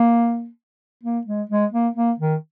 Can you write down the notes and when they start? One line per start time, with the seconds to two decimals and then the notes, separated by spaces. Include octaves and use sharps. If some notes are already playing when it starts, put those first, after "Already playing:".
Already playing: A#3
1.03 A#3
1.27 G#3
1.50 G#3
1.72 A#3
1.96 A#3
2.19 D#3